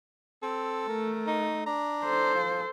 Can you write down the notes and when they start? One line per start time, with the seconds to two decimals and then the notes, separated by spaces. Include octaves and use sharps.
0.43 C4 A4
0.88 A3 A#4
1.27 D#4
1.67 D4 A#5
2.04 A4 C5
2.35 F3